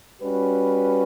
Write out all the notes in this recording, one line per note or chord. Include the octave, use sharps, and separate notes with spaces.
G3 C#4 F#4 B4